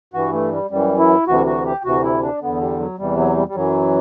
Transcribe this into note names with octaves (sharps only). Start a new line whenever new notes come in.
G2 E3 F#4
A3
G3
F#2 E3 G3
E4
D2 C3 E3 F#4
F#4
G4
D2 C3 E3 F#4
E4
D4
E2 D3 B3
G3
F#3
E2 C3 E3 G3
F#3
G3
G3
F#2 E3 F#3